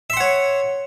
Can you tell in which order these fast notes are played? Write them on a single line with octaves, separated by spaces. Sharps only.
E5 C6 F#5 C#5